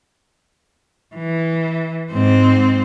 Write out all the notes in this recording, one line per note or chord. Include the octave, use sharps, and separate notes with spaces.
E3
G#2 C4